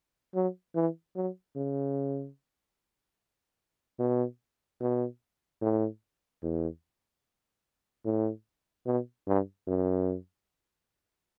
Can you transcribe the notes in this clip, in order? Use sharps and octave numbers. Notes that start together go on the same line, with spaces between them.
F#3
E3
F#3
C#3
B2
B2
A2
E2
A2
B2
G2
F#2